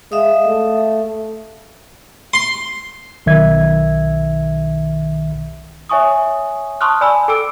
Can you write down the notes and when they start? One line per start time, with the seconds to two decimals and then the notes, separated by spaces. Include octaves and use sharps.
0.12 G#3 E5 F5 D#6
0.47 A3
2.33 C6
3.26 B1 D#3 E5 G#6
5.89 C#5 E5 G#5 C#6 D#6
6.81 A5 C6 C#6 D#6 F6 F#6
7.01 D5 G#5 B5 E6
7.28 A4 G5 D6 E6 D7